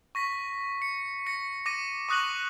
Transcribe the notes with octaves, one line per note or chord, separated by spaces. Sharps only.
C#6 A#6 B6
C#7
A#6 C#7
D6 A#6 D#7
C#6 D#6 F#6 A#6 F#7